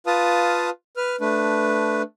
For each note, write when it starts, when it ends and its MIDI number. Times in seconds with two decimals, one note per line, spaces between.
0.07 0.70 65
0.07 0.70 71
0.07 0.70 77
0.07 0.70 81
0.07 0.70 87
0.97 1.16 71
0.97 1.16 89
1.21 2.02 57
1.21 2.02 62
1.21 2.02 71